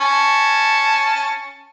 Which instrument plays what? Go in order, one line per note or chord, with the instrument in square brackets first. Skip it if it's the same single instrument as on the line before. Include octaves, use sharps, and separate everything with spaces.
[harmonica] C#4 A5